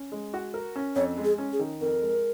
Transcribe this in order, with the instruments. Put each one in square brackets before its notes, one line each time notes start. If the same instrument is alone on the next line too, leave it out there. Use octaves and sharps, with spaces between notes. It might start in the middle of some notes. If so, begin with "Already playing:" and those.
Already playing: [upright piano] C#4
G#3
F#4
A#4
C#4
[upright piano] F2 [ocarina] C#5
[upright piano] G#3
[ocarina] G#4
[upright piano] C#4
[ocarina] G#4
[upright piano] D#3
[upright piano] F2 [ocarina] A#4
[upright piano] G#3